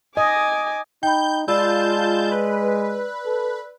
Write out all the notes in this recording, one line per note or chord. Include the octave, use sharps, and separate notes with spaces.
D#5 G#5 D6
D#4 G5 B5 G6
G#3 F4 D5 A5 B5 E6 G6
B4
A4